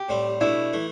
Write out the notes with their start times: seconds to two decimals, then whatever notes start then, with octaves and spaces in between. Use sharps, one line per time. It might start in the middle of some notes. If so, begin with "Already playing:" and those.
Already playing: G4
0.09 A2 G3 C4
0.41 B2 A3 D4 E4
0.73 E3 A3